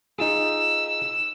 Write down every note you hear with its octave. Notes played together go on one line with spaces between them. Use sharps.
D#4 F4 G#4 E6